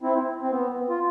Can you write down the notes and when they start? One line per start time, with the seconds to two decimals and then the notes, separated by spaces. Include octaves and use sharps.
0.02 C4 E4
0.43 C4
0.51 B3
0.89 F4